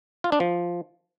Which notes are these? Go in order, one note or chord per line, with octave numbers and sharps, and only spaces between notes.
F4
D4
F3